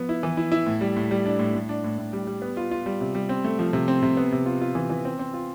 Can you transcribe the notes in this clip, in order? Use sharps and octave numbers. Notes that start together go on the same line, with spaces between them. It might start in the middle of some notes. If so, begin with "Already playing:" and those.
Already playing: F3 B3
E4
E3
E4
E4
A2
G3
A2
G3
D4
A2
A2
D4
A2
A2
G3
G3
B3
F4
F4
G3
C3
G3
C4
A3
F3
C3
C4
C3
B3
C3
F4
F4
E3
E3
C4
C4
F4